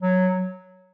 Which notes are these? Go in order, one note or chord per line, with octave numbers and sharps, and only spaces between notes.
F#3